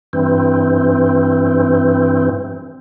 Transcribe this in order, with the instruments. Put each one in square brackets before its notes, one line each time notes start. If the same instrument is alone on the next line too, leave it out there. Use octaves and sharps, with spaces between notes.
[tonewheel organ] G2 E3 C4